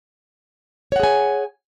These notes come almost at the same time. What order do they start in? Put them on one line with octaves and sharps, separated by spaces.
C#5 F#5 G#4 G#5